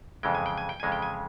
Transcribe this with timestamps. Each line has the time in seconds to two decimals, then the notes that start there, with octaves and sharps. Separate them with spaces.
0.23 F2 C#3 E3 G#3 G5
0.35 G#5
0.46 G5
0.57 G#5
0.69 G5
0.80 F2 C#3 E3 G#3 G#5
0.92 G5
1.02 G#5